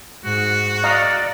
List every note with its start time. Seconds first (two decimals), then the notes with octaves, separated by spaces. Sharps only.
0.25 G#2 F#4
0.83 D5 D#5 F5 A#5